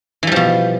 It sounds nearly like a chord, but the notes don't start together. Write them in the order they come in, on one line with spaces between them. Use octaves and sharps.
E3 G3 F3 B2